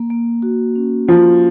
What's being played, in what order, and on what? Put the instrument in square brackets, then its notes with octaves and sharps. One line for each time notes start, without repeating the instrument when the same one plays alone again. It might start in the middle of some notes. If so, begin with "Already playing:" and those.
Already playing: [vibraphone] A#3
A#3
F#4
C#4
[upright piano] F3 [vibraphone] A#3